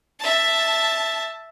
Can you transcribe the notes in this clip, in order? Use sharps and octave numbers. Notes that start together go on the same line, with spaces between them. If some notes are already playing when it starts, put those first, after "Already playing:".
E5 A5